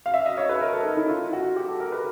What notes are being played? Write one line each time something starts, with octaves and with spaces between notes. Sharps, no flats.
F5
E5
D#5
C#5
B4
A#4
A4
D#4
E4
F4
F#4
G4
A4
A#4
B4